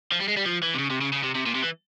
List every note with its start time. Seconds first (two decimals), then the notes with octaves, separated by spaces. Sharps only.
0.12 F3
0.20 G3
0.28 G#3
0.37 G3
0.46 F3
0.63 E3
0.74 C3
0.79 C#3
0.90 C3
1.01 C#3
1.13 C#3
1.23 C3
1.35 C3
1.46 A#2
1.55 C3
1.63 E3